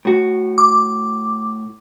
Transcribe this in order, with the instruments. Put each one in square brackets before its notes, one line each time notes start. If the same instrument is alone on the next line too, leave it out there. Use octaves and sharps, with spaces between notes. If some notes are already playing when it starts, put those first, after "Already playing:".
[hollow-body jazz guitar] A2 F#4
[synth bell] D6